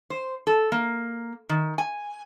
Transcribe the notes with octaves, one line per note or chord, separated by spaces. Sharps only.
C5
A4
A#3
D#3
G#5